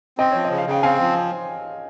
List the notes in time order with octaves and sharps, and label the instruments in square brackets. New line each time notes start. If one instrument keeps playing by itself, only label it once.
[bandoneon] C4 [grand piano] D#5 G5
[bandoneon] F3 [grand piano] C#5
[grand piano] D#5
[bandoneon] C#3
[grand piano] F5
[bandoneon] C#3 [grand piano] G5
[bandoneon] C4 [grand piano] F5 G#5
[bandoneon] F3